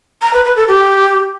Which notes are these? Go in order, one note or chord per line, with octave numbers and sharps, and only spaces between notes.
A#5
B4
B4
A4
G4